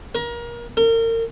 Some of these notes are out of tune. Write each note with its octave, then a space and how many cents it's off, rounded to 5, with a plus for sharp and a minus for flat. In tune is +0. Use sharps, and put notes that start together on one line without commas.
A#4 +30
A#4 -35